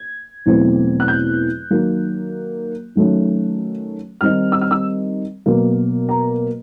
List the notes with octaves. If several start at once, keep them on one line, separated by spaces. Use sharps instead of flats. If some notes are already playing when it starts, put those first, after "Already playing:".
Already playing: G#6
E2 B2 F#3 A3 C4
F#6
G6
D#3 F#3 A#3
D#3 F#3 A3 C#4
D#3 G3 C4 D#4 F6
E6
F6
E6
B2 F#3 A#3
A#5